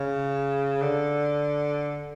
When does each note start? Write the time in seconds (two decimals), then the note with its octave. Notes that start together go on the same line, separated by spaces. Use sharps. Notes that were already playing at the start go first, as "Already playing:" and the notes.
Already playing: C#3
0.82 D3